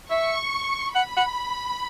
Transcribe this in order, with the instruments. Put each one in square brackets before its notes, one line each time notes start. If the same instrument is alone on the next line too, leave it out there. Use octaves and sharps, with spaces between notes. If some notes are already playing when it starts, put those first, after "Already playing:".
[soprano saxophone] E5 [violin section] C#6
[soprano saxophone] F#5 [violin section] B5
[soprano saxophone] F#5